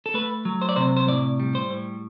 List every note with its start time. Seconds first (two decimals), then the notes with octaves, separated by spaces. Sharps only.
0.06 A4
0.14 A3 B4
0.45 F#3
0.62 C5
0.69 D5
0.76 C3 C5
0.97 C5
1.08 A2 D5
1.40 G3
1.55 C5
1.70 A2